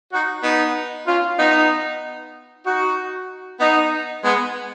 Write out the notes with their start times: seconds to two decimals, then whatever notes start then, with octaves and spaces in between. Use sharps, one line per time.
0.12 D#4 F#4
0.43 B3 D#4
1.07 C#4 F4
1.38 B3 D#4
2.66 D#4 F#4
3.60 B3 D#4
4.23 G#3 B3